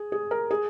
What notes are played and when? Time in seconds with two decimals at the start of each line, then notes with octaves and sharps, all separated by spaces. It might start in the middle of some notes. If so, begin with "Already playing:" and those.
Already playing: G#4
0.12 G#4
0.31 A#4
0.51 G#4